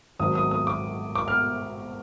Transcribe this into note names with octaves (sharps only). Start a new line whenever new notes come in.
G#1 G#2 F#3 D#6
D#6
D#6
D6
D6
F6